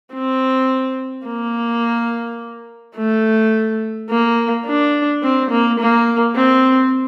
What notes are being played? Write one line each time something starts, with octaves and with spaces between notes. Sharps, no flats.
C4
A#3
A3
A#3
D4
C4
A#3
A#3
C4